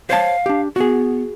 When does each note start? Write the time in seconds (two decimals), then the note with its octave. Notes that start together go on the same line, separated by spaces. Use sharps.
0.10 C5 C#5 F5 A5
0.46 D4 G4
0.76 B3 F#4 G#4